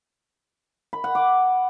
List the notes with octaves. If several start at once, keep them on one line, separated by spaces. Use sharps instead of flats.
B5
F#5
D6